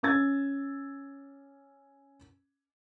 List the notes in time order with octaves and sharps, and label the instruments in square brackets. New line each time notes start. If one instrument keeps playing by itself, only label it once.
[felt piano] C#4 E6 G#6 A6